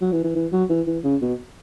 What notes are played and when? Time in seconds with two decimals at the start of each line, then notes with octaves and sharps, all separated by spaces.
0.01 F#3
0.12 E3
0.24 E3
0.35 E3
0.52 F#3
0.69 E3
0.86 E3
1.04 C#3
1.21 B2